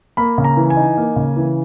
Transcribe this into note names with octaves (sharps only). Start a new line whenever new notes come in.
A#3 B5
C#3
A#5
E3
G#5
D#4
A#3
C#3
E3